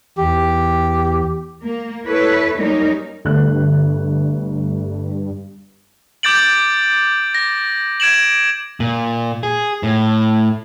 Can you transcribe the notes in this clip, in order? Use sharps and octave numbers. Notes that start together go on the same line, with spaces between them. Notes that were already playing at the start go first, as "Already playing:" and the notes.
E2 G4
A#3
E4 A4 B4 C#5
F#3 G3 A#3 C#4 D#4 A#4
G1 G2 A3 F#6
D6 G6 A6 D7 F#7
A#6
G#6 D7 E7 F#7
A#2
G#4
A2